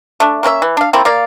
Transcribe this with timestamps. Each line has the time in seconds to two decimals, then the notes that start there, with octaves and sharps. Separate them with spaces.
0.20 A3 D4
0.43 A#3 C#4 A#4 E5
0.62 E3
0.77 D4 F5
0.93 A3 A#3 C4 E4
1.05 A#3 D5 F5